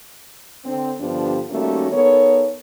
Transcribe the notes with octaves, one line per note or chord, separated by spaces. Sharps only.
D3 C4
G2 D3 F3 B3 D4 G4
D#3 G3 A3 A#3 C#4 F#4
B3 D#4 A4 A#4 C#5